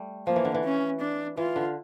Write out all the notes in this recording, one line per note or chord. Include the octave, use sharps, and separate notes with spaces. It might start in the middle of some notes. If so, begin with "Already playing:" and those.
Already playing: G3 A3
F3 A#3
E3
D3
E3
C#4
D4
E3 F4
D3